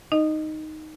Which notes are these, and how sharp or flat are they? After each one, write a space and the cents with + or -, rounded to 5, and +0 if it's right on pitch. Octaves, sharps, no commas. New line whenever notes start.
D#4 +0 D#5 -15